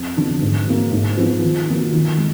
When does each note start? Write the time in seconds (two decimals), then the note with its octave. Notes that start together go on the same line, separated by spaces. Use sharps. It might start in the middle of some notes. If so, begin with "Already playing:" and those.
Already playing: F2
0.17 D3 F#3 B3 D4
0.42 G#2
0.67 F#3 A#3
0.92 G#2
1.17 F3 B3 D#4
1.42 D#3
1.68 F#3 A#3 F4
1.93 D#3
2.18 G#3